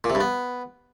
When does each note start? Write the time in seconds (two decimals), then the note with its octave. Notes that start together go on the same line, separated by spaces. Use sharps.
0.04 A#2
0.10 C3
0.15 G2
0.20 B3